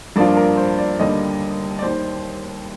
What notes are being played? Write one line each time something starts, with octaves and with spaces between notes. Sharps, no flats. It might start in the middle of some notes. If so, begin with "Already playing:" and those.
G2 F3 A#3 D4 F4 D5
A#4
C5
D5
D#2 D3 G3 A#3 D#5
D5
D#2 D#3 G3 C5